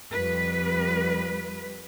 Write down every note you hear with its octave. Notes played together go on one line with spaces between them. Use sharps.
F2 G3 B4